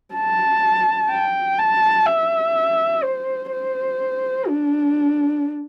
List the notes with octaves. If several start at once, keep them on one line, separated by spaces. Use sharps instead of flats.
A5
G5
A5
E5
C5
C5
D4